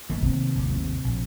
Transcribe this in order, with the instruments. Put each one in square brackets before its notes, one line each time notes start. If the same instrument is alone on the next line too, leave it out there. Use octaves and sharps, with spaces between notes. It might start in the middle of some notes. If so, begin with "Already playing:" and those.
[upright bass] G2 [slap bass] D#3 A#3 B3
[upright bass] C3
[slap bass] G#1 D#2
[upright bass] C3
[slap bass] A#1